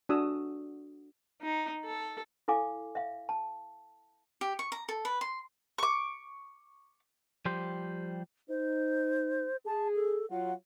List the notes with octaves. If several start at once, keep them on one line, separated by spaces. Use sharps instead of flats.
D4 F#4 D#6 E6
D#4
A4
E4 A4 F5 G#5 D6
E5 F5
A5
G4
C#6
A#5
A4
B4
C6
C#6 D6
F3 G3 G4 C5
D#4 C5
G#4 A5
A4
F#3 F4 F#5